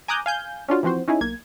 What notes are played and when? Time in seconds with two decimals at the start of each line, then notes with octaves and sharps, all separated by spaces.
0.08 G#5 A#5 D6 D#6 F#6 G6
0.26 F5 G#5 G6
0.68 C#4 D4 F4 F#4
0.83 E3 F3 C4 F#4 C5
1.08 C#4 D#4 E4 G#4
1.21 B1 A#3 G#6